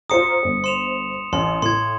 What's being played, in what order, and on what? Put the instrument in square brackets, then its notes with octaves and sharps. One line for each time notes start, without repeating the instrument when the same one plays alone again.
[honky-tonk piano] F4 C5 A#5 [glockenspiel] D#6 C#7
[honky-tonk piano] G1 C5
[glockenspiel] C6 E7 F7
[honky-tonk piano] A1 [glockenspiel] C6
[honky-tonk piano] A2 [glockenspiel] C6 G#6